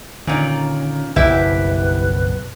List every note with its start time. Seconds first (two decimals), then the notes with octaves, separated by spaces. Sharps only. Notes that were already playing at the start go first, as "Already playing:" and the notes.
0.27 A#2 D3 D#3 C#4
1.16 F#1 B1 F2 E4 G4 B4 E5